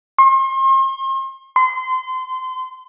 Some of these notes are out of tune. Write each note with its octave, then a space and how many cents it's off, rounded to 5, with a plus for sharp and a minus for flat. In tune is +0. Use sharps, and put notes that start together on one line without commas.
C6 +40
C6 -30